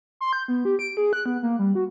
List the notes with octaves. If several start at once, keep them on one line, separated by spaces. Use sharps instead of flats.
C6
G6
B3
G4
D7
G#4
F#6
B3
A#3
G3
F#4